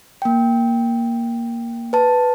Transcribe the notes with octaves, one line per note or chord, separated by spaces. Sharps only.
A#3 G5
B4 A5